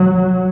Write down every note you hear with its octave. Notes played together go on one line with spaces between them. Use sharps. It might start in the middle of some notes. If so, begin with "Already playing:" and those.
Already playing: F#3